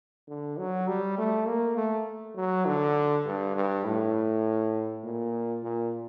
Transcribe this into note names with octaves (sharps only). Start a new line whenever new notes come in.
D3
F#3
G3
A3
A#3
A3
F#3
D3
G2
G2
A2
A#2
A#2